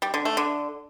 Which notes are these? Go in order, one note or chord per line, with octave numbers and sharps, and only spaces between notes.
G3
D3
A3
D3